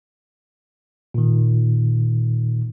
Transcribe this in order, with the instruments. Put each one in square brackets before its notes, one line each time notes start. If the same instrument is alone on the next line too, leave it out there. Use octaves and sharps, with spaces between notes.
[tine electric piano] A#2 D#3